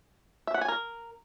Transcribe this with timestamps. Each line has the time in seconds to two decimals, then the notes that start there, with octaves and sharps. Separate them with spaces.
0.47 E5
0.54 F#5
0.61 G#5
0.68 A#4